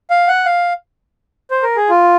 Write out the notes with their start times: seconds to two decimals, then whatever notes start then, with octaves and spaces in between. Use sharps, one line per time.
0.10 F5
0.28 F#5
0.46 F5
1.51 C5
1.63 A#4
1.77 G#4
1.90 F4